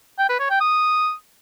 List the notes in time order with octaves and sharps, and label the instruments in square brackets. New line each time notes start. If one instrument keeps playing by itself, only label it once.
[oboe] G5
B4
C#5
G5
D#6